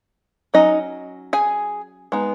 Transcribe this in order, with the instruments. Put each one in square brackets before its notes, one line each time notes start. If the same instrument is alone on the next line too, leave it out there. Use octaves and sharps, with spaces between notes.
[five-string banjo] F#3 C#4 D#4 D#5
G#4 G#5
G#3 B3 D#4